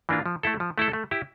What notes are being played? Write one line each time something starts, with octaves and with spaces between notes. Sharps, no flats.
E3 A#3 D4 F4
F3
A3 E4 A4
F3
A3 E4 A4
A3
E4 G4